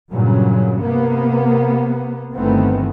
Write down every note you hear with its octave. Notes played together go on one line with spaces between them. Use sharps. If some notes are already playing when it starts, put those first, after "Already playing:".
G2 A#2 C#3 F#3
C3 A#3 B3
G1 D#3 E3 A3 B3 C4